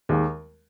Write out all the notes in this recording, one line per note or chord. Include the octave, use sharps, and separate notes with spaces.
D#2 D#3 G#3